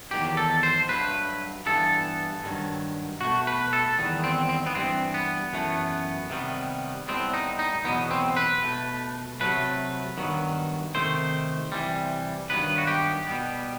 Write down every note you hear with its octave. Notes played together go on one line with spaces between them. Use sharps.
E2 D#3 F#3 G4
A4
C5
G2 F#3 A3 B4
G2 E3 B3 A4
G2 D#3 F#3
B2 A3 F#4
B4
A4
E2 D#3 G3 B3
C4
C4
B3
G2 E3 G3 C4
B3
F#2 E3 A3
C3 D#3 G3 B3
A2 G3 B3 C4
D#4
D#4
E2 B2 F#3 B3
C4
B4
B2 A3
C3 D#3 F#3 A3 B4
G2 D#3 F#3 B3
C3 D#3 A3 C5
C3 E3 G3
G2 D#3 F#3 B3 B4
F#4
G4
B2 G3 B3